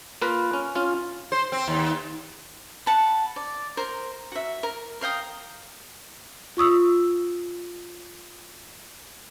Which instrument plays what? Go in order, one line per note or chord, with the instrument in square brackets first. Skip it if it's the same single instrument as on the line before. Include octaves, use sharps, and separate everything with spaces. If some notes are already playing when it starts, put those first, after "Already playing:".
[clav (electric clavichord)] A#3 F4 A#4 B4
C#4
C#4 F4
[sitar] C5
C4
D#2
[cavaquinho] F#5 A5 B5
D5
A#4 C5
F#4 E5
A#4
A#4 F5 G5 D#6
[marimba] F4 C#6 D#6 E6